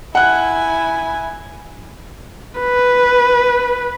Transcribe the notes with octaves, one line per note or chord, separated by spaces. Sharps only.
E4 F#5 G#5 F#6
B4